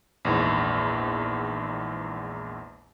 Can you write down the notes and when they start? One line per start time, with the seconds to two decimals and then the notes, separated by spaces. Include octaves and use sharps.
0.25 A#1 E2 G#2